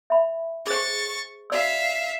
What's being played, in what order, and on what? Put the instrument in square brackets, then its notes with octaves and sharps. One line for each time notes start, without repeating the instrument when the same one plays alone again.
[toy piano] E5 B5
[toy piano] G#4 C5 [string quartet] C#6 A6
[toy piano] F#4 D5 E6 [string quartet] E5 F5